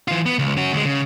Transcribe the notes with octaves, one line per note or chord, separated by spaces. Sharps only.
E3 F4
B3
C#2
C#4 F#4
D2 G#3
C#3